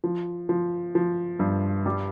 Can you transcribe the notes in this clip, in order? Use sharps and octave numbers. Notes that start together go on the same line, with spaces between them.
F3
F3
F3
G2
G3